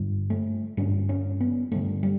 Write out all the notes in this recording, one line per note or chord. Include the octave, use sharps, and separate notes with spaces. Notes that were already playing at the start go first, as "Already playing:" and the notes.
Already playing: G2 D3
A3
G2 D3 C#4
C#4
B3
G2 D3 A3
G3